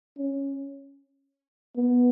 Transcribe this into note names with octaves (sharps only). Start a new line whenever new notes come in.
C#4
B3